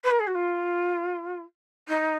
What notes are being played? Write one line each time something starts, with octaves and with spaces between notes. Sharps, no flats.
B4
A#4
G#4
F#4
F4
D#4